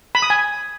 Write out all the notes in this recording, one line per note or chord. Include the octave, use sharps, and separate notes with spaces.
B5
D#6
G#5